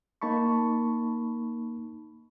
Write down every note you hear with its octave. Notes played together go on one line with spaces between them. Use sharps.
A#3 D#4 A5 B5 C#6